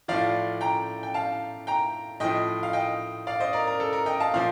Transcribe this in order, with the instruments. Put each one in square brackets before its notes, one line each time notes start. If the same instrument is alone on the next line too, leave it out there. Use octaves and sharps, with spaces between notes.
[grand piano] A2 F3 D5 F5
G5 A#5
G5
F5 A5
G5 A#5
A2 F3 D#5 G5
F5
D#5 G5
D5 F5
C5 D#5
A#4 D5
A#4
A4
A#4
D#5 G5
F5 A5
A#2 F3 D5 F5